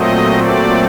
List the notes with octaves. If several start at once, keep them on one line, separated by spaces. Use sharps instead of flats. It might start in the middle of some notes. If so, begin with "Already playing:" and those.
Already playing: A#2 F#3 A3 C4 D#5
D5